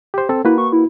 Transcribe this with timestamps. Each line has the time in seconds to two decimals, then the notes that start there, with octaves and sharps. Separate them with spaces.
0.14 G4 C5
0.29 C4 A4
0.45 A#3 E4 F#4 B4
0.58 C#6
0.73 E4